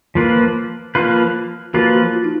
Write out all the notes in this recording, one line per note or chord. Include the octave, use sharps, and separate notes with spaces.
F3 A#3 F4 B4
F3 A#3 F4 B4
F3 A#3 F4 F#4 B4
F#4
F4
D#4